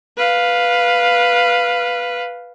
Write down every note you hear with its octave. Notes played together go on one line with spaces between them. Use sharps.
B4 F5